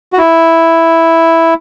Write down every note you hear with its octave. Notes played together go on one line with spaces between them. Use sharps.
F#4
E4